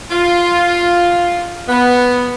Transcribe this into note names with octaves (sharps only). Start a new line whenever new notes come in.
F4
B3